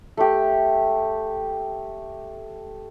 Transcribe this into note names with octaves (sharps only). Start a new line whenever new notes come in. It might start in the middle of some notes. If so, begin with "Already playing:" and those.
A3 G4